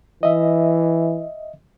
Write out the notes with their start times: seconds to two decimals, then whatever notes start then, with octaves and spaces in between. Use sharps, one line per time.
0.23 E3 D#5 E5